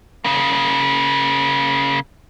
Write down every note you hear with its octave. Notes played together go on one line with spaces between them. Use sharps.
C#3 A#3